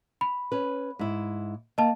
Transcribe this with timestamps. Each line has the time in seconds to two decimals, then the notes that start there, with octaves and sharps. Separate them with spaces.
0.21 B5
0.52 C#4 B4
0.99 G#2 E4
1.78 A#3 D#5 A5